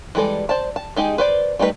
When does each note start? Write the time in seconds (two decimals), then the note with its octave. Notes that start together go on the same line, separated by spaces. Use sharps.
0.15 E3 G3 G#3 A4 D5
0.49 C5 D5 A5
0.76 A5
0.96 G#3 D#4 G4 G#4
1.18 B4 C5 D5
1.59 G3 A3 D#4 F#4 B4